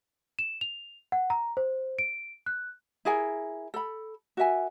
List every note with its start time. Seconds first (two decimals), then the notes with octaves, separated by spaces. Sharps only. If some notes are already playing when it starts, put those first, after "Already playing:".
0.39 E7
0.61 F7
1.12 F#5
1.30 A#5
1.57 C5
1.99 D7
2.46 F#6
3.05 E4 G#4 A#4 G#5
3.74 A4 B5
4.37 F#4 A#4 E5 G#5